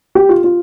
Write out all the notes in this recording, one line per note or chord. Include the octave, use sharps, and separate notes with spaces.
G4
F4
F4